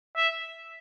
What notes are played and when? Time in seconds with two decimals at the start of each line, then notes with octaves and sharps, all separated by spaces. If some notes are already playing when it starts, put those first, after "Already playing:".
0.16 E5